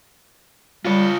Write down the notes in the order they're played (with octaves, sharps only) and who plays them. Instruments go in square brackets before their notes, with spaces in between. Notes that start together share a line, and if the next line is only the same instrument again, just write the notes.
[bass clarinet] G3 [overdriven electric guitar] F4 C#5